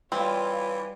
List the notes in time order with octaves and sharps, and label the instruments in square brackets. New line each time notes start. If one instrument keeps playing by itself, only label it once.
[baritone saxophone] E3 [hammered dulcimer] G3 [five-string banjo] C4 [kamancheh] F4 C#5